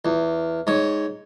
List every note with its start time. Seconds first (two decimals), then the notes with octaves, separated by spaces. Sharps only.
0.05 E2
0.67 G#2 C#5